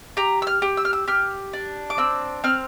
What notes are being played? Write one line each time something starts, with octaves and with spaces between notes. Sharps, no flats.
G4 A#5
E6
F6
G4
E6
F6
E6
G4 F6
D4
D6
C4 E6
C4 F6